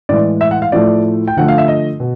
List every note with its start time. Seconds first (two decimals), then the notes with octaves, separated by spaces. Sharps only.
0.09 A2 E3 G#3 D5
0.41 E5
0.51 F#5
0.62 F5
0.72 A2 F3 A3 D5
1.28 G5
1.36 D3 F3 A3 F#5
1.48 F5
1.58 E5
1.68 D#5
2.00 B2